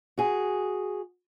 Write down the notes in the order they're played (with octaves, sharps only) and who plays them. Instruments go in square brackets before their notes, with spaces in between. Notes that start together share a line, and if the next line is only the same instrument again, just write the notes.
[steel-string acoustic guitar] F#4 G#4